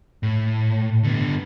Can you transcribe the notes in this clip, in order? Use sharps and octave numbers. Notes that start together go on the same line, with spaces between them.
A2
D3 B3